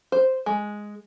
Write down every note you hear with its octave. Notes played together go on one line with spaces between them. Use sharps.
C5
G#3